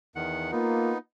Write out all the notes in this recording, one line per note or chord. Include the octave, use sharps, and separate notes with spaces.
E2 D#3 F#5
A#3 B3 D#4 F4